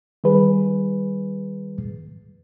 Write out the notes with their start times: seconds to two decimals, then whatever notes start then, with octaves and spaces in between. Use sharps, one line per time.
0.24 D#3 G3 G#4 B4